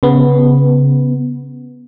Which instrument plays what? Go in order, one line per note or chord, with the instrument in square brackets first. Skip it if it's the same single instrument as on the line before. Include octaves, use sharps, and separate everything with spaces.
[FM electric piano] C#3 B3